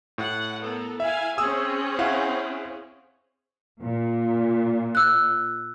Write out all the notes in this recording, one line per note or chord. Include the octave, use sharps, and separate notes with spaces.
A2 F#5
B3 A4 A#4
E4 E5 F5 G#5
C4 C#4 G#4 D#6 E6
E4 F5 F#5
A#2
E6 F#6